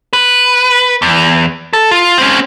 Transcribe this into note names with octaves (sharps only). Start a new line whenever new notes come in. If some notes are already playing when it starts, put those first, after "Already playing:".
B4
E2
A4
F4
C4 C#4